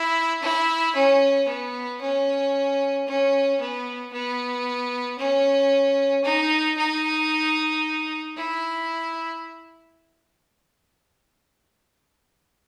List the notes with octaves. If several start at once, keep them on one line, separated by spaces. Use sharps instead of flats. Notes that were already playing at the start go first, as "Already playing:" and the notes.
Already playing: E4
E4
C#4
B3
C#4
C#4
B3
B3
C#4
D#4
D#4
E4